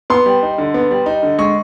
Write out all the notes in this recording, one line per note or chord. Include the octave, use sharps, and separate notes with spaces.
B3 C6
G3
D#4
D3
B3
G3
D#4
D3
G#3 C#6